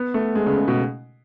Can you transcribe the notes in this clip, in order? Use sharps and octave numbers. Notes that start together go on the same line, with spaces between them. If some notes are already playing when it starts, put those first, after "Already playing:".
Already playing: B3
A3
G#3
C#3
C#3
B2